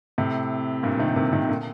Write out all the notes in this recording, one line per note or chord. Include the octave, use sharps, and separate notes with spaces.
A2 C3
G2 A#2
C3 D#3
C3 D#3
C3 D#3
A#2 D3